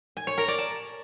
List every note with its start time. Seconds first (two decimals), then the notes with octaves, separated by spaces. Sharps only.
0.17 G#5
0.27 C#5
0.38 A#4
0.48 D5
0.58 A5